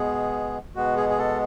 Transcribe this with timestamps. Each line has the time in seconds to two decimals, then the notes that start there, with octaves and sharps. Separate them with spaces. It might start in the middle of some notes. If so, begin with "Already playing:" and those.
Already playing: B2 G#3 B3 G#4
0.75 B2 G#3 B3 F#4
0.97 G#4
1.09 G#4
1.19 A4